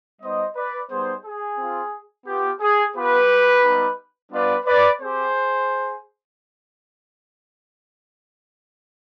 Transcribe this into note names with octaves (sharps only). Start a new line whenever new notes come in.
G3 B3 D#4 C5 D#5
B4 D5
G3 B3 D#4 G#4 C5
G#4
C4 F4
B3 F4 G4
G#4
B3 F4 G4 B4
G3 B3 D#4 G4
G3 B3 D4 F4 B4 D5
B4 D5
C4 G4 G#4 C5